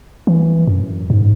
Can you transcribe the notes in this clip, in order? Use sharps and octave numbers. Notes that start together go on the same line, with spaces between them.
E3
F#2
G#2